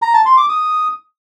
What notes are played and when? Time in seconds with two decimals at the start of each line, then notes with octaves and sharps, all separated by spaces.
0.02 A#5
0.14 A5
0.25 C6
0.37 D6
0.49 D#6